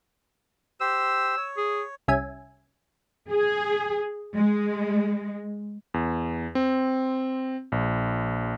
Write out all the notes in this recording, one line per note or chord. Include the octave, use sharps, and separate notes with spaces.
G4 C5 E6
C#5
G#4
C2 C#4 E5 G#5
G#4
G#3
E2
C4
A#1